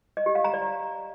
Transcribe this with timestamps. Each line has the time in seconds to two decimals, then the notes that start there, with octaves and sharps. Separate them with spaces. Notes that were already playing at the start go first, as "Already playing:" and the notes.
0.17 D#5
0.26 G4
0.35 F5
0.44 A#5
0.54 D5